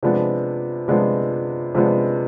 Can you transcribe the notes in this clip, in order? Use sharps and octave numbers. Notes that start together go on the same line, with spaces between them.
C3 F3 G#3 B3 D4
C3 F3 G#3 B3 D4
C3 F3 G#3 B3 D4